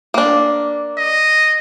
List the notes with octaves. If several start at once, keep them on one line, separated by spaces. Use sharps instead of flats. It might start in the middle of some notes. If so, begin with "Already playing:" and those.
A#3 D4
D#5